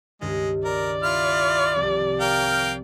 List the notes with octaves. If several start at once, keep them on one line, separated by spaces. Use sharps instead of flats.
C#2 G2 D#3 G#3
A#4 D5
E4 F4 F6
C2 F3
A#4 F5 G5